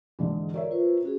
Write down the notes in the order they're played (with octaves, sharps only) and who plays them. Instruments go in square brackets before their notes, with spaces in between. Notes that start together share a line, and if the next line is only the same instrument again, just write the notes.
[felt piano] G#2 D3 E3
[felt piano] A#4 C#5 E5 [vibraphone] D5
[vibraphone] F4 B4 C5
C#4 F#4 G#4